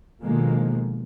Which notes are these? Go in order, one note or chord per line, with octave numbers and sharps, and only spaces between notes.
B2 D3 D#3 F3 G#3 A#3